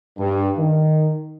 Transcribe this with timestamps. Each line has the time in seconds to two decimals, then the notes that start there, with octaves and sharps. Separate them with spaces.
0.18 G2
0.58 D#3